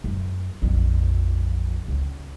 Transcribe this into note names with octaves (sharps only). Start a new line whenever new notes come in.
F#2
A#1 F2
C#2